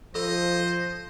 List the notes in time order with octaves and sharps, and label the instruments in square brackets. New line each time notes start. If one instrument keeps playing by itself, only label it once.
[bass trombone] F3 [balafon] A4 [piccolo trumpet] C5 [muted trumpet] D#5